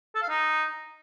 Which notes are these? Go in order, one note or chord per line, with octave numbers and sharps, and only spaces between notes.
A4
F5
D#4